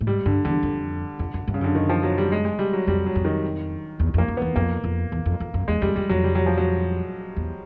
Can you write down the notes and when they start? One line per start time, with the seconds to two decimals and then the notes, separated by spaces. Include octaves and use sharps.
0.01 A2
0.07 G#2 G3
0.25 G2 D3
0.45 E2 D3
0.63 F2
1.19 F2
1.34 F#2
1.47 G2
1.54 C#3
1.61 F#2 D3
1.75 D#3
1.89 F3
2.03 F#3
2.18 G3
2.32 G#3
2.45 G#3
2.59 G3
2.73 F#3
2.87 F2 G3
3.06 F#3
3.15 F2
3.25 D#3
3.99 E2
4.14 F2 A#3
4.28 F#2
4.37 E2 B3
4.56 F2 A#3
4.84 F2
5.12 E2
5.26 F2
5.40 F2
5.54 F#2
5.68 E2 G#3
5.82 F2 G3
5.96 F2 G3
6.09 F2 F#3
6.24 G3
6.35 F#3
6.46 F3
6.58 F#3
7.36 E2